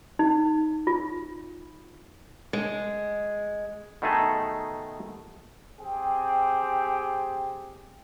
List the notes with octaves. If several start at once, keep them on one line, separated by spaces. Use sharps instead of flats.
D#4
F4
G#3
B2 D#3 A3 D#4 G#4 A4
C4 G4 G#4 G5